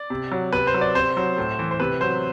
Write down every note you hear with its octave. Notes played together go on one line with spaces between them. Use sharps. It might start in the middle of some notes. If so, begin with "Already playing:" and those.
Already playing: D5
C3
F#3
C3 B4
C5
F#3
D5
C3 C5
F#3
A2
E3
C5
C3 B4
F#3 C5